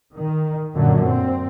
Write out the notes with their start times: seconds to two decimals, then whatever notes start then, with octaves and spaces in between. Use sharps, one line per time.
0.14 D#3
0.75 F#2 A#2 D3 F#3
1.04 A#2 C4